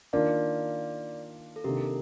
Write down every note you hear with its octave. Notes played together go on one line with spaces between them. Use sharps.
D#3 A#3 D4 F4 D5 F5
A4
C3 D#3 A#3 D4 G4 A#4